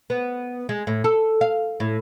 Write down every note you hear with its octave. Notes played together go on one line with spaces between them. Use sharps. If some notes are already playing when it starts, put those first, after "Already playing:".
B3
G#3
A2
A4
F5
A2